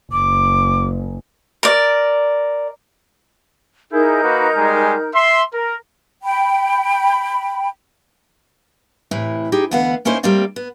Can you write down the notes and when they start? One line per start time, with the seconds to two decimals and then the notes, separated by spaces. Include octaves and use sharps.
0.12 F#1 D6
1.63 A#4 D5
3.91 D#4 E4 G#4 A#4 G6
4.22 A#3 F#4 B4
4.55 G3 G#3 G#5
5.14 E5 C6
5.53 A#4
6.23 G5 B5
9.11 A2 C3 E3 E4
9.52 D#4 G4 G#4
9.71 D2 E3 B3 F5 F#5
10.05 A#3 C#4 D#4 E4 C5
10.23 G3 A3 A#3 C4 D5 F5
10.56 B3